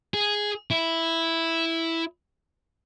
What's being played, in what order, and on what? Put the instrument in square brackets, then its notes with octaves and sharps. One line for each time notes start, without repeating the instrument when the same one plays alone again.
[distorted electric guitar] G#4
E4